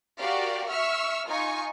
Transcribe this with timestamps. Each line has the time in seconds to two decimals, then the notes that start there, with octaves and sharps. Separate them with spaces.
0.18 F#4 G4 A#4 D5 F5
0.70 E5 C#6 E6 F6
1.27 D#4 F4 G#5 C#6